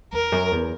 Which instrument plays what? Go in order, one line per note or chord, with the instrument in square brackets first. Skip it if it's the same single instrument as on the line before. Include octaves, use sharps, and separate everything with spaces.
[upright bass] E2 [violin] A#4
[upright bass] F#2
E2